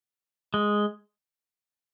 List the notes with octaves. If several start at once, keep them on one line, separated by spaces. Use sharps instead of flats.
G#3